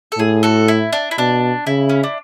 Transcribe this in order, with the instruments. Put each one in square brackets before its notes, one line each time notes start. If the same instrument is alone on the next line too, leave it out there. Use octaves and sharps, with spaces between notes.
[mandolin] A4
[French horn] A2 [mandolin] G#4
[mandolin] F#4 A4
E4
D4
E4
[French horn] B2 [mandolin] D4
[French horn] C#3 [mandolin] E4
[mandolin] C#4
D4